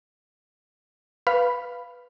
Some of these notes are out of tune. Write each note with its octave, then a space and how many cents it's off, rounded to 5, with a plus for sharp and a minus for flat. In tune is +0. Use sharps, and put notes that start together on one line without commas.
B4 +0 F5 -10 B5 +0